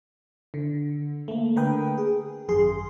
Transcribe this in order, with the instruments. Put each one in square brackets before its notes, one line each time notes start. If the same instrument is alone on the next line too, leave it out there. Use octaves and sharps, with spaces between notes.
[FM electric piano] D3
A3 A#3
D3 A#4 B4 G5 D#6
G#4
G#1 F#2 G#4 C6